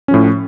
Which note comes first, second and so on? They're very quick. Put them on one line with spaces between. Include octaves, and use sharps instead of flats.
C#4 F3 A2